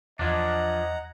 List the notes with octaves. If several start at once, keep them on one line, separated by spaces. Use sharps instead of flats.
E2 F3 D4 D#5 F#5 A#5 G#6